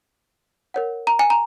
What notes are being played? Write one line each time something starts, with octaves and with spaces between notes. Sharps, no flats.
A#4 C#5 F#5
A#5
G#5
A#5